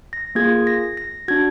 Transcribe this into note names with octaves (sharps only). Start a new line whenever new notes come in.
A#6
A#3 F4 G#4 G#6
A#6
A#6
D4 F#4 G#6